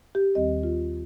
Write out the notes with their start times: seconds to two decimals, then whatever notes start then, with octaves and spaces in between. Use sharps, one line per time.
0.15 G4
0.35 D#2 D#3 G3 C4 D#5
0.63 F4